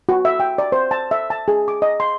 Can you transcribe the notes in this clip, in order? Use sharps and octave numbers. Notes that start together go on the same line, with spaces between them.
F#4
E5
G5
D5
C5
A5
E5
A5
G#4
D6
D#5
C6